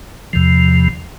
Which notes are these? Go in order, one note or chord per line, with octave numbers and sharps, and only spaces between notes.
E2 C3 F3